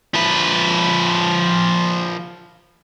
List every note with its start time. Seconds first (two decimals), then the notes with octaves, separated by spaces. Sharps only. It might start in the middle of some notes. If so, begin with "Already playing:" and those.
0.14 F3 B4